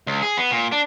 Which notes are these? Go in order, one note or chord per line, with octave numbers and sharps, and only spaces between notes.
C#2
G#4
B3
A#2
D4